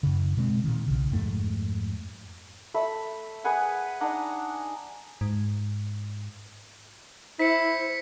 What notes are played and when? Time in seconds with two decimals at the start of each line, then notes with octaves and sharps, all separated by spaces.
0.03 F#2 C#3
0.37 B2 G#3 C4
0.64 A#2 D#3
0.88 B1 C#3
1.12 F2 G#2 A3
2.74 A3 E5 B5
3.44 G#4 B4 F#5 G#5
4.01 D4 D#4 F#5 A#5
5.21 G#2
7.39 E4 C5 B6 C#7